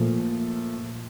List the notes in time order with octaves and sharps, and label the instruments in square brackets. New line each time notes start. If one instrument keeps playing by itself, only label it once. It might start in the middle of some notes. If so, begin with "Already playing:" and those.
Already playing: [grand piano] A#2 F3 A3